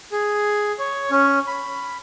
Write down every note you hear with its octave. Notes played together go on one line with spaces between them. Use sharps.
G#4
C#5
C#4
B5